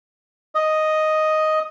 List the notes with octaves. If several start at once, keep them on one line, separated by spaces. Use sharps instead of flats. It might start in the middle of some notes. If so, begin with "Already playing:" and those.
D#5